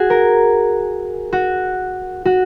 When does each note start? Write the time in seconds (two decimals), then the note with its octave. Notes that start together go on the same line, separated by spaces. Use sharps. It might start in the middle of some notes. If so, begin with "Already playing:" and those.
Already playing: F#4 G#4
0.10 A#4
1.33 F#4
2.25 F#4